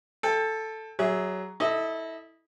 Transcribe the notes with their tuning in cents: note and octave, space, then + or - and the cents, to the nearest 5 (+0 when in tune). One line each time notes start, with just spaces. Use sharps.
A4 +0 G5 +30
F#3 +15 G#4 +0 E5 -15
E4 -20 A4 +0 D#5 +0